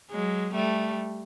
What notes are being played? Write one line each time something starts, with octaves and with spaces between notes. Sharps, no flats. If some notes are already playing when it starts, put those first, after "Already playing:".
F#3 G#3
G3 A3